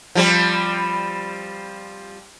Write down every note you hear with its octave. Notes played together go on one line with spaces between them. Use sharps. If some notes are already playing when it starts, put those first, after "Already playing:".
F3 G3 C4